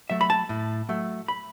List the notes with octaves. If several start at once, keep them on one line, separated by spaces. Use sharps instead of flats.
F#3 A3 E5
B5
A5
A2
F#3 A3
B5